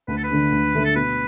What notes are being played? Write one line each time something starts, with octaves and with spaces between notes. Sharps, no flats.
D2 B4
A4
B4
D3 A3 D4
D2
D3 A3 D4
A4
B2 B4